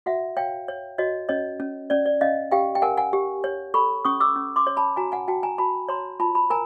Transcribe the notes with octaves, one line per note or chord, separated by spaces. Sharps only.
F#4 E5 F#5
C#5 F5 G5
C#5
F#4 C#5 D#5
C#4 C#5 D#5
C#4
C#4 D5
D5
C#4 D#5 F5
G4 F5 G5
G5
A#4 F#5 G#5
F#5 G#5
G4
C#5
A4 B5 C#6
C#4 C#6 D#6
D6 E6
C#4
C6 D6
C#5
A5 B5
F#4 G#5 A#5
F#5 G#5
F#4 G5 A5
G#5 A#5
F#4 A5 B5
C#5 A#5 C6
F4 A5 B5
A5 B5
A#4 G#5 A#5